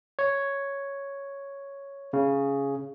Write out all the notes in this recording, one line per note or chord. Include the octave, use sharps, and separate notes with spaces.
C#5
C#3